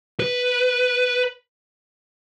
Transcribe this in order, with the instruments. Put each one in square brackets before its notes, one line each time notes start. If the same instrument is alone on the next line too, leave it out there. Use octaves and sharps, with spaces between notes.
[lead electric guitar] B4